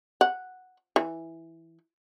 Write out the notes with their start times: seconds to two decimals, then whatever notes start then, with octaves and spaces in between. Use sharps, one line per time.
0.21 F#5
0.96 E3